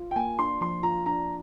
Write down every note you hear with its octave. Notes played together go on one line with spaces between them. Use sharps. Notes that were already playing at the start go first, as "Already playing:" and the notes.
Already playing: F4
G5
A#3 G#5
D4 C6
F3 C6
F4 A#5
D4 A#5